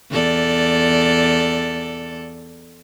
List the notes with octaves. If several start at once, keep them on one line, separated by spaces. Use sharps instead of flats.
E2 A4 D5